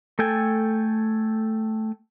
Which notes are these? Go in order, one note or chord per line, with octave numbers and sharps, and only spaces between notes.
A3 A4 G5 G#5